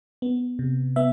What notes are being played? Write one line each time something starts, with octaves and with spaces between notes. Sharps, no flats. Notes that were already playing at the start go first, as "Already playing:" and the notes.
B3
C3
B3 E5